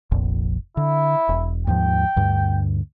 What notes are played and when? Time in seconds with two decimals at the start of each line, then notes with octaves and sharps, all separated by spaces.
0.12 F1 A#1 F2
0.77 D3 E4
1.29 E1
1.67 D#2 G#2 F3 G5
2.16 D2 G2 D3